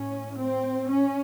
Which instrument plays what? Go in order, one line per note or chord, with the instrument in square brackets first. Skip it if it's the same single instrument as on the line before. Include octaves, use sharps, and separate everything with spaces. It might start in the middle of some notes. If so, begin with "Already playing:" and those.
Already playing: [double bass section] A2 C#4
C4
C#4